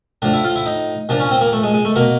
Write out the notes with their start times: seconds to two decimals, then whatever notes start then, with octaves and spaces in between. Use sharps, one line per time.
0.22 A2 F3 D4
0.34 E4
0.44 F4
0.56 E4
0.66 D#4
1.09 A#2 F3 D4
1.20 C#4
1.31 C4
1.41 A#3
1.53 A3
1.63 G#3
1.74 G#3
1.85 A3
1.96 B2 A#3